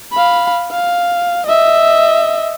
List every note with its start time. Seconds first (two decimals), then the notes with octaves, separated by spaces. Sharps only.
0.12 F5 B5
0.71 F5
1.46 D#5 E5